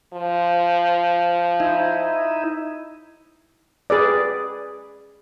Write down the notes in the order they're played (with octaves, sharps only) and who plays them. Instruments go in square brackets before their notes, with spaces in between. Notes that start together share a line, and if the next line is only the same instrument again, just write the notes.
[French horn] F3
[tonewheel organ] D#4 E4
[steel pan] G#4 B4 D5